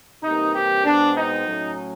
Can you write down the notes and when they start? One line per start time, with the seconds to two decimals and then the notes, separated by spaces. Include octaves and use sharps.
0.23 C3 E3 G3 A#3 D#4
0.53 G4
0.84 B2 G#3 C4 D4
1.16 D#4
1.47 A2 F#3 A3 C#4